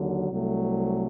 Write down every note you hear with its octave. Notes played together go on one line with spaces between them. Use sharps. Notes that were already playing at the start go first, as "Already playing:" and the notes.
Already playing: D#2 D3 F#3
C2 C3 F#3 A3